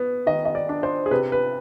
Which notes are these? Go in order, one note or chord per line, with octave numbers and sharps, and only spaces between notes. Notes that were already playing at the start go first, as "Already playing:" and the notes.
Already playing: B3
D#3 D#5
D#5
D5
D4
C5
G#4
C3 B4
B4